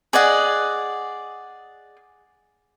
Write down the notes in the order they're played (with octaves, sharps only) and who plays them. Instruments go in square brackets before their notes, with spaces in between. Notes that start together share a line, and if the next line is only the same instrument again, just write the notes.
[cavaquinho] G#4 D5 D#5 F#5